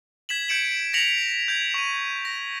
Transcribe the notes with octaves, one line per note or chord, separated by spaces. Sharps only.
G#6 B6 E7 F#7
G6 G#6 C#7 D7 E7 F#7
A#6 B6 C#7 F7 F#7
G6 G#6
C#6 D#7
A#6